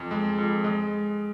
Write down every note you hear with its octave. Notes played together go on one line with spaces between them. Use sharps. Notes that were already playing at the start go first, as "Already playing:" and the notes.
Already playing: F2
G#3
F2
G#3 D#5